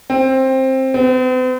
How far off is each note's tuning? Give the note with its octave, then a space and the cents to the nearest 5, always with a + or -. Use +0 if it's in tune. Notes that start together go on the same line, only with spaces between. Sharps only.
C4 +15
C4 -45